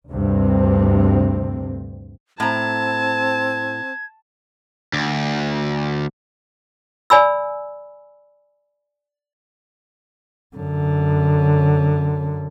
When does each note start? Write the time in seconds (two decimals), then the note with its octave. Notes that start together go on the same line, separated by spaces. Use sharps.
0.10 D2 G2 C3 C4
2.40 A2 C4 A5 A#5 G#6
4.93 D2
7.10 D5 G#5 B5 E6
10.56 F#2 D3